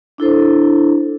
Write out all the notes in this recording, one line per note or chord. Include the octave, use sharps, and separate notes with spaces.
D4 E4 A4 C5